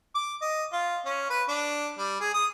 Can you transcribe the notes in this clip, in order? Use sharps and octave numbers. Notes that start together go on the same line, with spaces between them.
D6
D#5
F4
C#4
B4
D4
G3
G#4
D#6